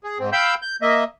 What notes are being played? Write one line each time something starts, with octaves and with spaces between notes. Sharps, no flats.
G#4
G#2 C4
F5 G5 B5 E6 G6
G6
A#3 D#5 E5